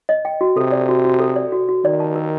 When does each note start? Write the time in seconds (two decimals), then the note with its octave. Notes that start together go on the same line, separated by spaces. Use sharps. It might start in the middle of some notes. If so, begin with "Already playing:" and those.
0.09 D#5
0.25 G5
0.41 F#4
0.56 C3 A4
0.72 D5
0.89 F#4
1.05 F#4
1.20 A4
1.36 D5
1.52 F#4
1.69 F#4
1.84 D#3 D5
2.00 A5
2.16 A#4